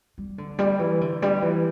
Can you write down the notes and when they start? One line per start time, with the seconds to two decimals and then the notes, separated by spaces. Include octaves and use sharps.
0.18 G3
0.38 D3
0.59 G3
0.79 E3
1.01 D3
1.22 G3
1.42 E3